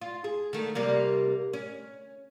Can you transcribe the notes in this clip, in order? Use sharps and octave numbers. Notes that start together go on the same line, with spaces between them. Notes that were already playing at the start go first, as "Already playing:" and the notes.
F4
G#4
D#3 A3
C3 G3 A#3
C#4